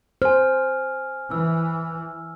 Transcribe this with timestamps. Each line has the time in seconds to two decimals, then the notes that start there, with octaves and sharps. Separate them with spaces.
0.22 C5 G#5 F6
1.31 E3 E6